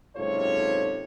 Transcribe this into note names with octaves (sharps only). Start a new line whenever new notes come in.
F#1 G#2 C3 F4 A4 C#5